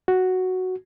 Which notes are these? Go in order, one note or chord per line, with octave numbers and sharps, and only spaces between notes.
F#4